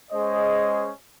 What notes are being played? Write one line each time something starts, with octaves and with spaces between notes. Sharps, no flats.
G#3 C#4 G#4 C5 D#5